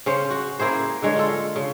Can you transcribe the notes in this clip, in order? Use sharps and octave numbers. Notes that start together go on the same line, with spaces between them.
C#3 C#4 C5
F#4
A#3 E4 G#4 C5
D3 G#3 C#5
F4 A4
C#3